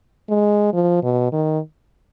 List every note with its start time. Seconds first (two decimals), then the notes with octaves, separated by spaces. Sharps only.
0.30 G#3
0.73 F3
1.03 B2
1.32 D#3